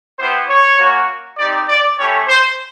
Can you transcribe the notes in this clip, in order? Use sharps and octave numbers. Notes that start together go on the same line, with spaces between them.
B3 E4 G4 C5
C#5
A#3 C#4 F#4
C4 D#4 G4 D5
D5
A3 C#4 E4 G4 C#5
C5